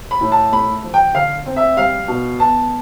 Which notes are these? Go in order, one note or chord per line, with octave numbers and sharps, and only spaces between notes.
B5
A2
A5
A3 B5
F3
G5
D3 F5
C4
E5
G3 F5
B2
B3 A5